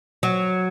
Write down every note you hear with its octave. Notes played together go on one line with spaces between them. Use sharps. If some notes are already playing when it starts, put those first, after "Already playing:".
F#3